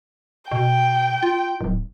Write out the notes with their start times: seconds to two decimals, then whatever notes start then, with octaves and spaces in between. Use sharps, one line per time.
0.51 B2 G5
1.23 F4
1.61 D1